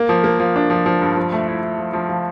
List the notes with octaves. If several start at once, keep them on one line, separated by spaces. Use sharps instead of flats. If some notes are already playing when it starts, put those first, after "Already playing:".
Already playing: A#3
F3
A#3
F3
D4
F3
F3
G2
F3
A3
E4
E4
F3
F3
F3